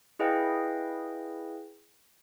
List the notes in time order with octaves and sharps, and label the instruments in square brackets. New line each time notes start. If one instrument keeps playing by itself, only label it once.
[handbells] E4 G#4 B4 D#5 F5 G5